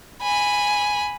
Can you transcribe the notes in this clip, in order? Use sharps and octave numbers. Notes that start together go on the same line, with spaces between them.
G#5 B5